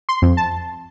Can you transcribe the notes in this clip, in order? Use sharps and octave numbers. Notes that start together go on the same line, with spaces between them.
C6
F2
A5